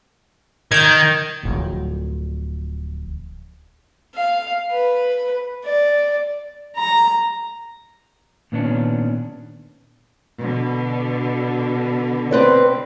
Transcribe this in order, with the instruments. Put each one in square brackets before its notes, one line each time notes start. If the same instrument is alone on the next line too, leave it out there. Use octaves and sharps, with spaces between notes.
[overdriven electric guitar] D#3 [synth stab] G6 G#6
[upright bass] D1 F3
[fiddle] F5
B4
D5
[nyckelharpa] A#5
[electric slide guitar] A#2 D#3 B3 C#4 D4 C#5
[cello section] B2 D3
[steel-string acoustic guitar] C4 B4 D5